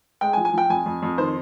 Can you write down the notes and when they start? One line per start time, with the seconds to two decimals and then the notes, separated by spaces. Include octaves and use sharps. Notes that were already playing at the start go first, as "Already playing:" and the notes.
0.21 G#3 G5
0.33 G#5
0.37 F3
0.45 G#5
0.53 F3 G5
0.70 F2 G#5
0.86 F2
1.02 F2
1.18 D#3 C5